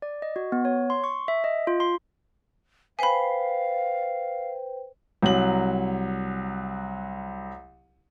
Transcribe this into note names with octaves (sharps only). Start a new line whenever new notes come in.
D5
D#5
F#4
B3
C#5
C6
C#6
E5
D#5
F4
C6
B4 C5 F5 G5 G#5 B5
C2 F#3 F#7